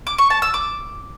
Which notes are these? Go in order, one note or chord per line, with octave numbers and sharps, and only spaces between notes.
D6
C#6
A5
E6
D6